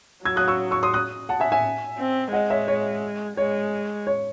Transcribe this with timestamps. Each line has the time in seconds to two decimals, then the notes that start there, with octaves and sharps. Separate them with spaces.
0.24 F#3 E6 G#6
0.36 D#6 F#6
0.48 C#6 E6
0.71 C#6 E6
0.83 C6 D#6
0.94 D#6 F#6
1.29 F#5 A5
1.40 E5 G#5
1.52 E5 G#5
1.99 C4
2.32 G#3 D#5 F#5
2.50 C#5 E5
2.68 C#5
3.37 G#3 C#5
4.07 C#5